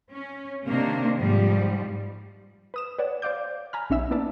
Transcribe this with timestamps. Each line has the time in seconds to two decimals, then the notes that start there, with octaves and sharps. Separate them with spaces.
0.12 C#4
0.67 C3 D#3 A#3 D4
1.17 G#2 F3 G3
2.74 B4 D#6 E7
2.99 B4 C#5 D5 F#5
3.22 C5 D5 F5 D6 G6
3.73 G#5 A#5 B5 F6
3.90 B1 C#4 D#4 E5 E6
4.11 A#3 B3 E4 D5 E5 A5